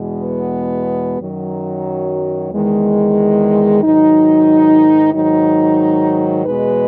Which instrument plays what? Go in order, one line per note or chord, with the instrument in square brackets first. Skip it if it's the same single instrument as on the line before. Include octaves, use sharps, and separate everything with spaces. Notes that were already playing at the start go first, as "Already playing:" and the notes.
Already playing: [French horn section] E2 B2 G#3
B3
F#2 D#3 F#3
E2 D#3 G#3
G#2 D#3 F#3 D#4
G#2 D#3 F#3 D#4
E2 B2 G#3 B4